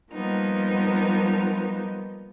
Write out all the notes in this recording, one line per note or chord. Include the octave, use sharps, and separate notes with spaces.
F3 G3 A#3 B3 D#4